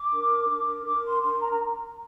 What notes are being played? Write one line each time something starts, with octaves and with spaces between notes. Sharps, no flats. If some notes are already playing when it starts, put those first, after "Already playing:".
Already playing: D6
D4 A#4
D4 A#4
D4 A#4 D6
C6
D4 A#4 C6
A#5
A#5